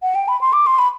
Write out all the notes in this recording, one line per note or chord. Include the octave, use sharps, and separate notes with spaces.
F#5
G5
B5
C6
D6
C6
B5